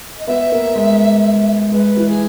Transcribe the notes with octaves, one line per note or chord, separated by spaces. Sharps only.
D#5
B3 E5
A#3
G#3
G#3 B4
E3
G#4